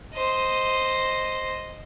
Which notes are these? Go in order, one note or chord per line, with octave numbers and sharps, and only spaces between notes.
C5 D#5